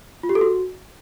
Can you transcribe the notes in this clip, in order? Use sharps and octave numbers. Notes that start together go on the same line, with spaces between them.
F4
G4
A4
F#4